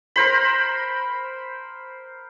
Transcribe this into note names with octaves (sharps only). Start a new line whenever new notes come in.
A#4 C5 B5